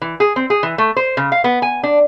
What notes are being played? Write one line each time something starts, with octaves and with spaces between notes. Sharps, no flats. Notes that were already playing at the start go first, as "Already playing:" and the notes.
E3
G#4
C4
G#4
E3
A3
C5
C#3
F5
B3
G#5
D4